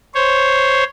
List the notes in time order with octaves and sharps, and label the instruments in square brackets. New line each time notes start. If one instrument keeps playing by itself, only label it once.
[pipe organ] C5 C#5